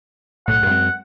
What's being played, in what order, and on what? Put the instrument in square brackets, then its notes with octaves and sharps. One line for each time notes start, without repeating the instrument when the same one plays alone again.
[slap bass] B1 A2 [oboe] F#5
[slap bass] F#2 G#3 C4